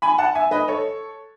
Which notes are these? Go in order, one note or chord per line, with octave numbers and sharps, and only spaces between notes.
G#5 B5
F#5 A5
E5 G#5
B4 D#5
A4 C#5